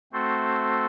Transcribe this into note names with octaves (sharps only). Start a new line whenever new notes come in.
A3 C4 F#4 A4 C5